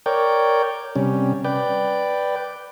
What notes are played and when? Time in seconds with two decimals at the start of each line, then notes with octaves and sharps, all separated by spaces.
0.06 A#4 C#5 D5 G5
0.96 C3 G3 C#4
1.44 B4 D5 G5